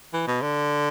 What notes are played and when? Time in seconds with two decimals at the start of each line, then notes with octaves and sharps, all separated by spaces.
0.13 E3
0.27 B2
0.42 D3